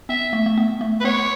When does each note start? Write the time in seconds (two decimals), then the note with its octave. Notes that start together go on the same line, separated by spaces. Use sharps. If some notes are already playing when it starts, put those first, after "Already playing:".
0.09 B3 E5
0.33 A3
0.46 A3
0.57 B3
0.81 A3
1.00 B4
1.04 B3 C#5